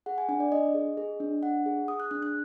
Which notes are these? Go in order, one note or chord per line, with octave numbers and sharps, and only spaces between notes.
G#4 F#5
G#5
D4 G#5
D5
D4 D#5
G#4
G#4
D4
D4 F#5
G#4
G#4 D#6
F#6
D4 F#6
F#6